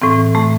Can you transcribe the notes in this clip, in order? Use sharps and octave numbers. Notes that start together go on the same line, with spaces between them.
A2 E3 C4
A2 E3 A3